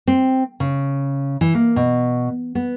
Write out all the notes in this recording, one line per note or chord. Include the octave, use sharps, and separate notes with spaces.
C4
C#3
E3
A#3
B2
B3